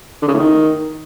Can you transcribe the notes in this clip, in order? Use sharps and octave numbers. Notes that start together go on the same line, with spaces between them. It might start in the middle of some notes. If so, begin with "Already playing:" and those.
D3
C#3
A2
D#3